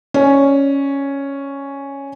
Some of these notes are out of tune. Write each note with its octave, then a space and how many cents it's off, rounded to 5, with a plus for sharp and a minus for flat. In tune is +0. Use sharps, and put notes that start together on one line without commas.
C#4 +0 D5 +0